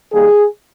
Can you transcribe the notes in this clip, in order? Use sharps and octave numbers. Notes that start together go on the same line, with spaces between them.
D#3 G3 A#3 G#4